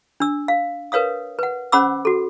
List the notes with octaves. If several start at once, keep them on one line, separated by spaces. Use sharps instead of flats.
D4 E6
F5
A#4 B4 C#5 F5 D#6
B4 F#5
C#4 C5 F#5 B5 D6 E6
F#4 A4